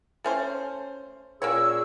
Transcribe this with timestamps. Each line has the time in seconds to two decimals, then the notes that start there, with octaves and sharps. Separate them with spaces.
0.24 A3 C#4 C5
1.42 A#2 A#3 C#4 G#4 C#5 E6